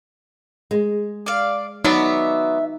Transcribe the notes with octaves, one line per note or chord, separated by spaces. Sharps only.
G#3
D5 F5
F#3 B3 D#4 D5 E5